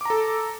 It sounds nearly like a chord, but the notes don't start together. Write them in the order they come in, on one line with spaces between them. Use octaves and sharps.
D6 A#5 A4